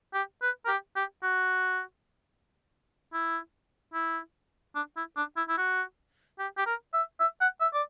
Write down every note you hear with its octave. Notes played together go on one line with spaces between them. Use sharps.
G4
B4
A#4
G4
G4
F#4
E4
E4
D4
E4
D4
E4
E4
F#4
G4
G4
A#4
E5
E5
F#5
E5
D5